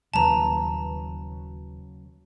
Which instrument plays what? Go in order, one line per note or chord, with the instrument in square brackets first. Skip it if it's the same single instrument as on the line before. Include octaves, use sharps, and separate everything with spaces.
[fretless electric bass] D#1 D#2 [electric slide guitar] C#3 F#3 B4 [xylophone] A5 A#5